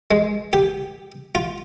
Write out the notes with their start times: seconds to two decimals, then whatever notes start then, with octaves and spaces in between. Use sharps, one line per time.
0.11 G#3
0.53 G4
1.35 F4